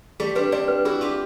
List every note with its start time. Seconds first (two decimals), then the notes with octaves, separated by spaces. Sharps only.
0.20 G3 A3 G#4
0.35 C4 D4 B4
0.52 C4 D4 D5
0.68 B4
0.85 E4 F#4 G#4
1.01 F4 G4 G#4